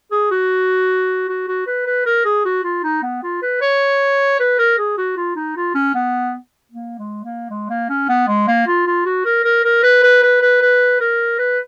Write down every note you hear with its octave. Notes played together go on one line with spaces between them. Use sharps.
G#4
F#4
F#4
F#4
B4
B4
A#4
G#4
F#4
F4
D#4
B3
F4
B4
C#5
B4
A#4
G#4
F#4
F4
D#4
F4
C#4
B3
A#3
G#3
A#3
G#3
A#3
C#4
B3
G#3
A#3
F4
F4
F#4
A#4
A#4
A#4
B4
B4
B4
B4
B4
A#4
B4